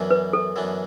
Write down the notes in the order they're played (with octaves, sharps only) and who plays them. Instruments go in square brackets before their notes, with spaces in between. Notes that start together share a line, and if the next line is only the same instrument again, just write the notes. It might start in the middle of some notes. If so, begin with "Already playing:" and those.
Already playing: [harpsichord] F#2 E3 B3 D4
[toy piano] B4
A4
[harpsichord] F#2 E3 B3 D4